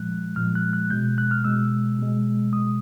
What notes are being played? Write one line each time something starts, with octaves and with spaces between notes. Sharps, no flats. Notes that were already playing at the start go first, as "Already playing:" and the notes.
Already playing: A#2 F3 G#3 F#6
A#2 F3 G#3 F6
F#6
F#6
B2 G#3 G6
F#6
F6
B2 G#3 E6
B2 G#3
B2 G#3 D#6